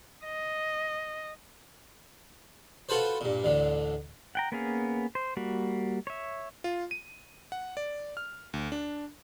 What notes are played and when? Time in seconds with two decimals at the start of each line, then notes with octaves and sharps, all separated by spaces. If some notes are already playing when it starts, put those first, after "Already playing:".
0.25 D#5
2.89 F4 F#4 A4 B4 C5
3.21 G2 A#2
3.44 A1 D2 D3
4.35 F#5 G5 A#5
4.52 A#3 B3 C#4 G#4 F5
5.15 C5
5.37 G3 A#3 F#4
6.07 C#5 E5
6.64 F4
6.91 D#7
7.52 F#5
7.77 D5
8.17 F6
8.54 D2
8.72 D4